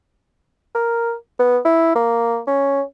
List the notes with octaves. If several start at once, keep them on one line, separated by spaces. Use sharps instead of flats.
A#4
B3
E4
A#3
C#4